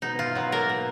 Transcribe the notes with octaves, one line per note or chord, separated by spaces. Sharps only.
B2 D#4
F4
F#3 B3
A#3 A#4
B2